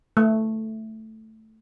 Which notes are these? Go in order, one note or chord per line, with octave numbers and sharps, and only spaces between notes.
A3